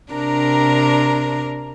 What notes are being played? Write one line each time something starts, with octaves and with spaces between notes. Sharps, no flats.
C3 D4 A#4 A#5